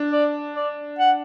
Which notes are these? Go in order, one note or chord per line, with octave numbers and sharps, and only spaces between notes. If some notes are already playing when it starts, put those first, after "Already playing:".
Already playing: D4
D5
D5
F#5